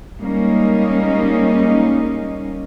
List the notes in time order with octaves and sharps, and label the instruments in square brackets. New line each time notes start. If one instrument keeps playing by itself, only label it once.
[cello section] G3 G#3 A#3 C#4 D#4